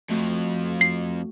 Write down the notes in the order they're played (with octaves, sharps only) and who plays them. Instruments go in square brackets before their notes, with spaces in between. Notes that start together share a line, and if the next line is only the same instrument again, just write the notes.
[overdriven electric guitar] F2 F3 [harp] A3 F#4
[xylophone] C7